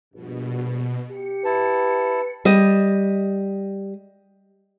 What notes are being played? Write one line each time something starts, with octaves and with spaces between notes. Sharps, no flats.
A#1 G2 B2
G4 C#7
E4 B4 A5
G3 D#5